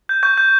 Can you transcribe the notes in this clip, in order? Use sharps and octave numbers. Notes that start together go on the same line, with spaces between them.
G6
C#6 G6
G6